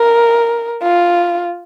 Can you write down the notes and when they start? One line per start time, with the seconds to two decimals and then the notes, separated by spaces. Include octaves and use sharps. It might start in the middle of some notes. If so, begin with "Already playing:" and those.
Already playing: A#4
0.83 F4